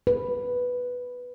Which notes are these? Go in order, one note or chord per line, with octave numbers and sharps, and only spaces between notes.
B4